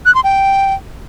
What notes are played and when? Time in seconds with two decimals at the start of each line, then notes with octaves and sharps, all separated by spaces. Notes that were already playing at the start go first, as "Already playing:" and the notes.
0.06 F#6
0.15 C6
0.24 G5